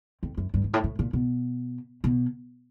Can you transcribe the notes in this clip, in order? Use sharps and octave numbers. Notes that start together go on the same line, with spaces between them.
F2
F#2
G2
G#2
A2
A2
A#2
B2
B2